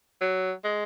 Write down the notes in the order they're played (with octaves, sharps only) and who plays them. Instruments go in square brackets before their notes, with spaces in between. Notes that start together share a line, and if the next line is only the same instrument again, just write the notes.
[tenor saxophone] F#3
G#3